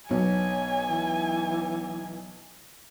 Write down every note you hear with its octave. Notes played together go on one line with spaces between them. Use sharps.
B1 B3 C#5 G#5
E3